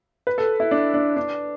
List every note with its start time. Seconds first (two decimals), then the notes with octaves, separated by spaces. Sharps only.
0.27 B4
0.38 A4
0.60 E4
0.71 D4
0.94 D4
1.16 D4